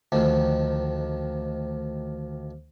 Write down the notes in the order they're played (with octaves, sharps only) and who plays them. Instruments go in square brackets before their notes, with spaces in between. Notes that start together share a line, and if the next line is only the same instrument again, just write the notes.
[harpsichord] D2 D#3 F3